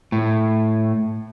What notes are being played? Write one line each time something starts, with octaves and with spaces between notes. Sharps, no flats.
A2